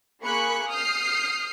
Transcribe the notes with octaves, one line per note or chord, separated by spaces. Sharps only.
A#3 G#4 B5 C#6 F#6 C#7
D#6 F6 G6 C7